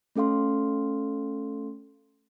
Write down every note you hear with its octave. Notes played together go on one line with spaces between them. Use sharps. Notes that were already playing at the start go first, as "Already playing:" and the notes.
A3 C#4 A4 F5 C6